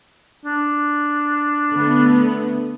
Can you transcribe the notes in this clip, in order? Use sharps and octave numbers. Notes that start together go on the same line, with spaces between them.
D4
D3 A3 B3